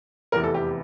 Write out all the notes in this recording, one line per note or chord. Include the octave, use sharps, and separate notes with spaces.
F1 E2 C3 E3 A#4
A4
G4